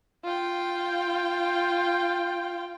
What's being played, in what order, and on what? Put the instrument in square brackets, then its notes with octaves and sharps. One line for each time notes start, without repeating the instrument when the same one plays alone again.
[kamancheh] F4 G5